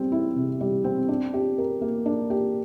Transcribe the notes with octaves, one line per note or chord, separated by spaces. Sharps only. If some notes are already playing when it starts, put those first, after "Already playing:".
Already playing: G3 C4
E4
C3
G3
C4
D4
G4
A#4
A#3
D4
G4